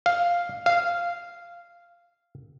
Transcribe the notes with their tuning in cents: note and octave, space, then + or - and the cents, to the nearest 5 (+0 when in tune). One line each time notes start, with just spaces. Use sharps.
F5 +0
F5 -10